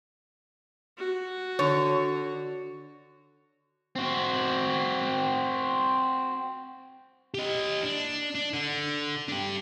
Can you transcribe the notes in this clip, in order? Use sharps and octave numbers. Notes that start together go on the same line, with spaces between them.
F#4
D3 C#5
C4 F#4
G4 D#5
D4
D4
D3
D4 G4